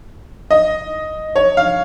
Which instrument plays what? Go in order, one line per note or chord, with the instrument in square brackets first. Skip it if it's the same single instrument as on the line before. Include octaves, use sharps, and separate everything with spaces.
[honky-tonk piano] D#5
C#5
F5